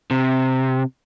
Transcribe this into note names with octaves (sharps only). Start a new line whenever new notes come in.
C3